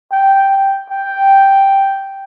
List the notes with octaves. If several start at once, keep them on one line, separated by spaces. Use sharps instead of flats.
G5
G5